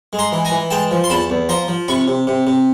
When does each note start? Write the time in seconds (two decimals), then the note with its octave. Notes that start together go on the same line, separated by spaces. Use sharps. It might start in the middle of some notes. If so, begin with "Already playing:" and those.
0.13 G#3
0.19 A#5 C6
0.32 E3
0.45 G#5 A#5
0.52 E3
0.71 G#3 G5 A5
0.91 F3
1.04 C6
1.10 E2 A5 B5
1.30 E2
1.49 F3 A#5 C6
1.68 F3
1.88 C3 B5 C#6
2.08 C3
2.27 C3
2.47 C3